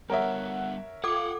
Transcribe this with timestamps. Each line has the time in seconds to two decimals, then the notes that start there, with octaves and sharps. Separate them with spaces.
0.10 G3 B3 A#4 C#5 E5 F#5
1.04 F4 A4 F5 F#5 D6